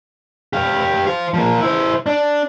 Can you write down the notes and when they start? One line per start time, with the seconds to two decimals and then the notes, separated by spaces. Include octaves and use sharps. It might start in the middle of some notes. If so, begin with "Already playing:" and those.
0.53 G4 F5
1.07 C5 F5
1.34 F3 A#3
1.61 E4 C5
2.06 D4